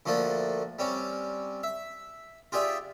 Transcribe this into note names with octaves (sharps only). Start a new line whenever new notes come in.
D2 F3 A3 A#3 D4
G3 C4 C#4
E5
F4 G4 G#4 D5 E5